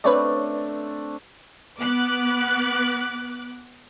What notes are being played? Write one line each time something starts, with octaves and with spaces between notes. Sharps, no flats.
A3 C4 D4 B4 C#5 D5
B3 D6 F#6